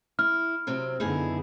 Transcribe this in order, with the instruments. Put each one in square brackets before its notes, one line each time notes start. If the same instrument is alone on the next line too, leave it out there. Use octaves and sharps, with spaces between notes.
[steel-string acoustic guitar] E4 [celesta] F6
[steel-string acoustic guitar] C3 F#3 C4
[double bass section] F#2 D3 B3 [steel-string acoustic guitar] D#4 E4 G#4